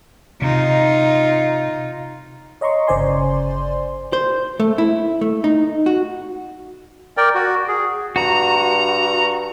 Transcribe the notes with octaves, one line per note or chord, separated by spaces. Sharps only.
C3 D#4 F4
C#5 D#5 A#5 C6 C#6
G1 C#3 C5 D5 G#5 C6
C5
A3
E4
A3
D#4
F#4
A#4 D5 G5
F#4
G#4
G2 F#4 A#5